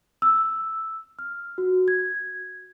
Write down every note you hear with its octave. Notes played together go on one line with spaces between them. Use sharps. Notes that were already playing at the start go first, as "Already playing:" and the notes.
E6
F6
F#4
G#6